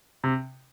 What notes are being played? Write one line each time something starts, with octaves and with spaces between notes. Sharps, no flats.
C3